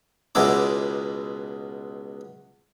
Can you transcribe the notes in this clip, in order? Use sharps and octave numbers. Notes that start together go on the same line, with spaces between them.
C#2 B2 G#3 B3 E4 D6